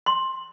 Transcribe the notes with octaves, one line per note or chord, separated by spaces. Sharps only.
C6